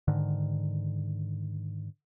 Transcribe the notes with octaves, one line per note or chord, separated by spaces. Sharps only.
G#2 D3 D#3